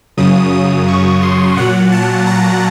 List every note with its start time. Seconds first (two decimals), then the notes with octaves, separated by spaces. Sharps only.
0.17 F#2 C#3 F#3 D#6
0.53 D#6
0.88 C#6
1.22 C6
1.57 A#2 F#3 F#5
1.92 A5
2.27 A#5